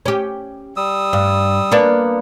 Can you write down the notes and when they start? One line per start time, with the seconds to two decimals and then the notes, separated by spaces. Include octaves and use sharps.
0.06 C#4 G4
0.77 G3 D#6 E6
1.13 G2
1.72 A#3 B3 D4